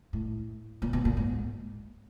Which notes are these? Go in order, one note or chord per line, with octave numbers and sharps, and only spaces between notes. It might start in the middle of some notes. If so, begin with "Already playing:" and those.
A2
A#2
B2
A#2
G#2